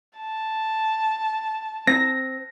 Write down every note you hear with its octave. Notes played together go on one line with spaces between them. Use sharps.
A5
C4 A#6